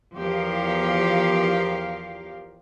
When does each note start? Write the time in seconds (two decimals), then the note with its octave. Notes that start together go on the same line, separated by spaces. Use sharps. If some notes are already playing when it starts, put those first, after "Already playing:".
0.16 E2 F3 G4 A#4 F5